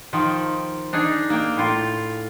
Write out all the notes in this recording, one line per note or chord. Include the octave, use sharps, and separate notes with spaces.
D#3 F3
D4 D#4 G#4
A#3 A#4 G5
A2 F4